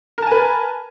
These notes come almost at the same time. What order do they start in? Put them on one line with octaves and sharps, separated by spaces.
A#4 A5 G#5 B4